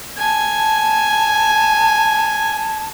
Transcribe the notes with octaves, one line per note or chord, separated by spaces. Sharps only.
G#5 A5